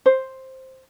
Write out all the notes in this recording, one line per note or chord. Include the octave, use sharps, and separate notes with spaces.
C5